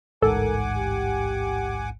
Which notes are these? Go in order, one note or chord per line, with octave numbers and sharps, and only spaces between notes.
A1 D2 G#2 A4 A#4 F#5 G#5 D6
G4